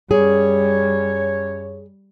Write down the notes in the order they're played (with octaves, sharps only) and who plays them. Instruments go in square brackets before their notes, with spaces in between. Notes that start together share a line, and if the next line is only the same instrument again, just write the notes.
[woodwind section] F#2 C#5 [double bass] G3 [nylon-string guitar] G#4